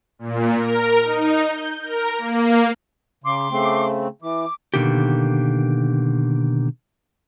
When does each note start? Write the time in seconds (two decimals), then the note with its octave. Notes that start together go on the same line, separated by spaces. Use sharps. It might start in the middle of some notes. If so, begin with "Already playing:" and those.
0.19 A#2
0.57 A#4
1.04 D#4
1.47 G6
1.84 A#4
2.18 A#3
3.24 C#3 C6 D6
3.51 C#3 A3 C4
4.22 E3 D6
4.74 B2 D3 D#3 A#3 G4